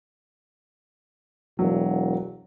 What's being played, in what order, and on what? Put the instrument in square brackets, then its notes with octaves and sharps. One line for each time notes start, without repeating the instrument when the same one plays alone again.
[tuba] E1 [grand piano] F#3